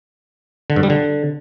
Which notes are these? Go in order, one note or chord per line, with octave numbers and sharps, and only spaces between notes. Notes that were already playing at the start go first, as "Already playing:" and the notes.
D3
G2
G3
D3